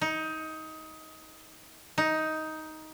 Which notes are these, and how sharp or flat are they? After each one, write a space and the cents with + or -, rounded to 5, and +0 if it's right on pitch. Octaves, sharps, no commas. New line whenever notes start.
D#4 +20
D#4 +10